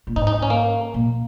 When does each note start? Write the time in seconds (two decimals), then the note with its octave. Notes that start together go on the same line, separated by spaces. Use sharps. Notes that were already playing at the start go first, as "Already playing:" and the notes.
0.07 A#2
0.16 G#2 D#4
0.27 D#4
0.43 C#4
0.50 A#3
0.94 A#2